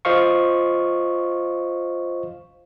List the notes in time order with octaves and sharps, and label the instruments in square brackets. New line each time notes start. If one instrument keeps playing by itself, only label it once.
[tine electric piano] F4 C5 D#5 F5 C#6